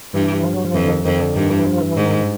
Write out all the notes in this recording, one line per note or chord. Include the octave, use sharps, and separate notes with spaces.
G2 E3
F3
F#3
F3
F2 E3
D3
D#3
F2 D#3
D3
G2 D#3
E3
F3
E3
G#2 D#3